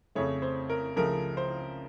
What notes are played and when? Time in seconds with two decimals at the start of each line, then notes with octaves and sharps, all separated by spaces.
0.15 F2 C#3 A3 C#5
0.42 C5
0.70 A#4
0.96 C#2 C#3 F3 A3 A#4
1.37 C5